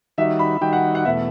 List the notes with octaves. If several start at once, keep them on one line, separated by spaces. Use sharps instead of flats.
D#3 G3 D#4 F#4 E5
B5
D#3 G3 D#4 F#4 G5
F#5
F#5
E2 B2 A3 E5